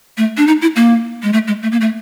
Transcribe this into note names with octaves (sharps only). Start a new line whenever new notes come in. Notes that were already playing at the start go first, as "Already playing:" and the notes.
A3
D4
D#4
E4
A#3
G#3
A3
G#3
A3
A#3
A3